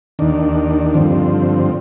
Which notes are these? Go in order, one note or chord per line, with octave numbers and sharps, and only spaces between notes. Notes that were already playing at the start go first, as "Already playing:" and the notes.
D#2 D#3 D4
G2 D3 F3 C4